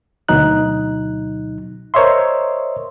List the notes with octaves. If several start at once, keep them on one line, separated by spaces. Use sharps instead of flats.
D2 B2 F#3 D#4 F#6
A#4 C5 C#5 D#5 E5 C6